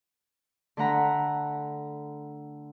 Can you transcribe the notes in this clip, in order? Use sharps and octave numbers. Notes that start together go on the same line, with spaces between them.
D3 A3 F#5 A#5 B5